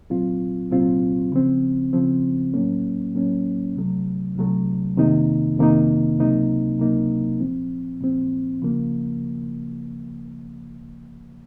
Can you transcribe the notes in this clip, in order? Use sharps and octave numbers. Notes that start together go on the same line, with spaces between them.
C2 A#2 F#3 C4 F4
C2 A#2 F#3 C4 F4
C#3 F3 C4
C#3 F3 C4
A2 F#3 A#3 C#4
A2 F#3 A#3 C#4
C2 C3 F#3 A3
C2 C3 F#3 A3
F2 C3 D#3 A#3 D#4
F2 C3 D#3 A#3 D#4
C#2 C3 F#3 A#3 D#4
C#2 C3 F#3 A#3 D#4
A#2 F3 C4
A#2 F3 C4
C#3 F3 A#3